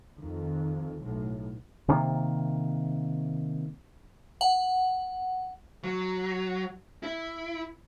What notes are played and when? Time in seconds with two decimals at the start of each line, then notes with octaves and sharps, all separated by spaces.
0.18 F2 D#3
1.00 B1 A2
1.88 C3 D#3 A#3
4.41 F#5
5.84 F#3
7.03 E4